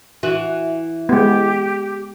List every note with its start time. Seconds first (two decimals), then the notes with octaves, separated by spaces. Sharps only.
0.23 E3 F#4
1.09 G#3 B3 G4